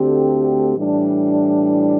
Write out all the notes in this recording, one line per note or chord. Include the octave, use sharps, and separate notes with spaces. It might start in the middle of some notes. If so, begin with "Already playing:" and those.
Already playing: D2 D3 A3 C4 G4
A2 E3 G3 D4